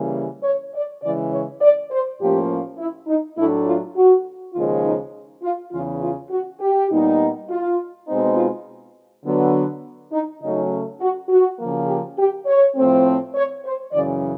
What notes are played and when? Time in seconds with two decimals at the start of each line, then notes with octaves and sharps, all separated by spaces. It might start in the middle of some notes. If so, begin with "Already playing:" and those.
Already playing: C#3 E3 G3 A#3
0.43 C#5
0.74 D5
1.02 C#3 E3 G#3 D5
1.31 C#5
1.61 D5
1.91 C5
2.19 A2 F3 A#3 C#4 G4
2.78 E4
3.07 D#4
3.37 A2 F#3 A3 D4 E4
3.66 F4
3.96 F#4
4.54 D#2 C#3 F3 G#3 F4
4.83 D#4
5.42 F4
5.72 E2 C#3 E3 F4
6.01 F4
6.30 F#4
6.60 G4
6.89 A#2 G3 B3 D#4
7.48 F4
8.06 B2 G#3 C4 D#4
8.36 F4
9.23 D3 F#3 B3
10.12 D#4
10.41 C#3 F#3 A3 C#4 D#4
11.00 F#4
11.29 F#4
11.59 C#3 F3 A#3
11.87 G4
12.18 G4
12.46 C#5
12.76 A2 F3 A3 C4
13.05 C5
13.35 C#5
13.64 C5
13.93 F#2 C#3 E3 D5